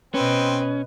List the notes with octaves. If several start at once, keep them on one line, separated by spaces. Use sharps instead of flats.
B2 C4 C#4 B4 D#5